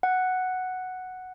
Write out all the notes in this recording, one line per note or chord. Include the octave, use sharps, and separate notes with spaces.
F#5